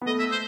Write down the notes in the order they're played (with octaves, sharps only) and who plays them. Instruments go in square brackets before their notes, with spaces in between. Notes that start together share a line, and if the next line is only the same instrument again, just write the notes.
[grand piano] B3
[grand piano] A3 [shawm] D#5
[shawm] E5
C5